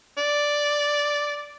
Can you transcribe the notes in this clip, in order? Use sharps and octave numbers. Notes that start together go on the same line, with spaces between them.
D5